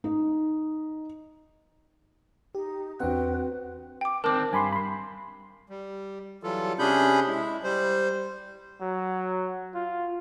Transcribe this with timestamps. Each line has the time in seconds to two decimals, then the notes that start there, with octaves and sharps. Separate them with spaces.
0.04 D#4
2.55 D#4 G4
3.00 E2 C4 D4 F#4 B4 F#5 G5
4.01 G5 D6
4.24 D#3 C4 D4 A#4 A5 D6
4.53 G2 G#5 B5 C6
4.72 B5 C6
5.69 G3
6.43 E3 F#3 G3 F4 A4
6.79 C3 C#4 D4 G#4 B5 G6
7.27 G#3 E4
7.64 G3 C5
8.81 F#3
9.74 F4